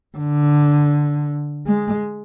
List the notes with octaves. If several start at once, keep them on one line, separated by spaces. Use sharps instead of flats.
D3
G#3